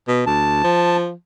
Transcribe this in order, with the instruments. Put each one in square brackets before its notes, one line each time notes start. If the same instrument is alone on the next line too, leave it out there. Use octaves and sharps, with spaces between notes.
[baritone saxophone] B2
[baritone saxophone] D2 [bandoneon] A5
[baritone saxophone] F3